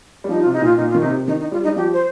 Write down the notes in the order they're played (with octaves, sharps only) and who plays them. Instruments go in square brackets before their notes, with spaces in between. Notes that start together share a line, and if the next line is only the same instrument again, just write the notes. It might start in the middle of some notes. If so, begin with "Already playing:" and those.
[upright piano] G3
[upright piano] F3 [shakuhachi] D#4
[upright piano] C3 [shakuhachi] F4
[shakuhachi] D#4
[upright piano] A#2 [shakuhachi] F4
[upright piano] A#2 [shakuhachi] D#4
[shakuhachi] F4
[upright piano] D#3
[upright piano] C3 [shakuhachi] D#4
[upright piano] C3
[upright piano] D#3 [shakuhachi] D#4
[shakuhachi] D#4
[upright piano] G3 [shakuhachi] F4
[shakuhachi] D#4
[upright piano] G3
[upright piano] F3 [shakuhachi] G4
[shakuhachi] C5